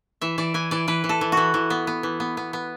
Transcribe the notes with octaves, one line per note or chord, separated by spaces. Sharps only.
E3 E5
E3 D5
E3 G#5
E3 D5
E3 B4
E3
A4
E3
E3 F#4
E3
B3
B3
E3
B3
B3
B3